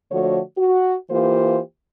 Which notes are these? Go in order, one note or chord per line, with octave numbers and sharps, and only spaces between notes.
D3 F3 A3 F#4 C#5
F#4
E3 A#3 F4 G4 C5